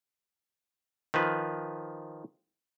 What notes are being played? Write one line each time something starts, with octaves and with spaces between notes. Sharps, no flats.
D#3 F3 B4